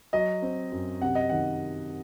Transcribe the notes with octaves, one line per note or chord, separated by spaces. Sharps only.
F#3 D#5
C4
F#2
C3 F#5
D#5
D#3 F#5